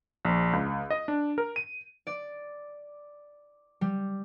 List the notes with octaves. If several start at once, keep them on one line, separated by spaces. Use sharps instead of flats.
A#1
C#2
D#5
D4
A#4
D#7
D5
G3